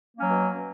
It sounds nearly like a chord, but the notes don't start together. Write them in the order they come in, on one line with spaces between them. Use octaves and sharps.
A#3 C#4 F#3 B2